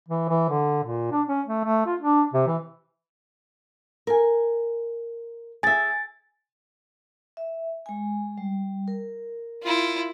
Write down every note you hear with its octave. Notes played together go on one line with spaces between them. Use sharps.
E3
E3
D3
A#2
D4
C#4
A3
A3
F4
D4
C3
E3
A#4 G#5
G#4 E5 G#5 A6
E5
G#3 G#5
G3
A#4
E4 F4